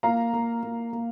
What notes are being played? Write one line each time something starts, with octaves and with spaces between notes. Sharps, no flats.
A#3 F5 A#5
A#3
A#3
A#3